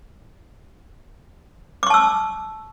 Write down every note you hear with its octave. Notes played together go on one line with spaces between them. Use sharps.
A5 C#6 D6 E6